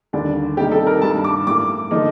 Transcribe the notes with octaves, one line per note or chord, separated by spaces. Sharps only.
D#2 D3 G3 D4
C3 D#3 G3 A#3 D#4 G4
A4
A#4
G2 D#3 G3 A5
D6
A2 G3 A#3 D6
D3 F3 A#3 D#4